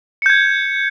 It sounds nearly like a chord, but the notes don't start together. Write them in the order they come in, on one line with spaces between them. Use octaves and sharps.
C#7 G6 G#6